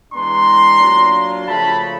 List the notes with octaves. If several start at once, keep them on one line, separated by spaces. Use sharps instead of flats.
E3 G#3 B3 D4 A#5 C6
F#3 A#3 D4 F4
C#3 F3 A3 A5 B5